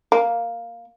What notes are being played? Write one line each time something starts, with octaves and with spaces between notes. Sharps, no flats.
A#3